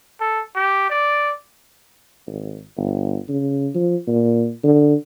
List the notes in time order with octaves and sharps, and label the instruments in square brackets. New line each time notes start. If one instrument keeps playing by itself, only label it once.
[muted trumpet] A4
G4
D5
[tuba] G#1
G1
C#3
F3
A#2
D3